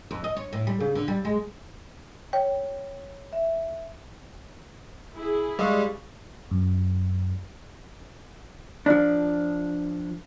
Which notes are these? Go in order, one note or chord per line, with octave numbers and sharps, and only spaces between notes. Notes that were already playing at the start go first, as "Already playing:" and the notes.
F2
D#5
C#5
A2
G3
C#3
D3
G3
G#3
C#5 G5
E5
E4 G#4
G3 G#3 G4 F5 C#6
F#2
F3 D4